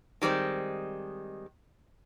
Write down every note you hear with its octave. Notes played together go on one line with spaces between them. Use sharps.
D#3 G3 G#3 C4